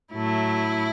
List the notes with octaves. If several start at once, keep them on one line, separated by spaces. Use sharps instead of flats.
A2 F#3 A3 E4